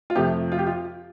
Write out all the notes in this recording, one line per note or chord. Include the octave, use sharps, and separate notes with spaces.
F4
F2 C3 F3 A3 G4
F4
G4
F4